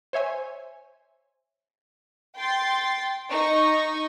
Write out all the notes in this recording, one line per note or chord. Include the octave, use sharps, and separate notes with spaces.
C5 C#5 E5 G#5
G5 C6 A6
D#4 C#6